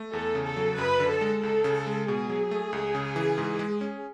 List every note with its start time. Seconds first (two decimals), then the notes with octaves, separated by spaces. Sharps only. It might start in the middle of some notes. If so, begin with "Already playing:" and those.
Already playing: A3
0.13 E2 A4
0.35 C#3
0.45 A4
0.56 F#3
0.78 F#2 B4
0.99 D3
1.10 A4
1.21 G#3
1.42 C#2 A4
1.64 C#3
1.87 G#3
2.08 B2 G#4
2.29 F#3
2.51 A3
2.73 C#2
2.95 C#3
3.16 E3
3.38 G#2
3.59 G#3
3.81 C#4